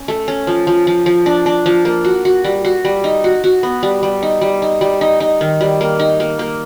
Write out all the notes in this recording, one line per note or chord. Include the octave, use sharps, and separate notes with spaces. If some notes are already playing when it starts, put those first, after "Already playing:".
Already playing: C#4
A3
C#4
F3
F3
F3
F3
D4
D4
F3
A#3
F#4
F#4
G3
F#4
G3
D#4
F#4
F#4
B3
G3
G3
D#4
G3
D#4
G3
D#4
D#4
D#3
G3
A#3
D#4
A#3
A#3